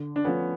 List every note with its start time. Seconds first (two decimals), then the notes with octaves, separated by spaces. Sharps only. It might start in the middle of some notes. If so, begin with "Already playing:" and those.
Already playing: D3
0.16 D4
0.24 F3 A3 B3 C#4